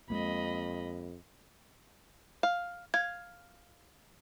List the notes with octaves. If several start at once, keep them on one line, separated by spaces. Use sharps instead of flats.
F2 G#3 A#3 D#5 B5
F5
F5 G#6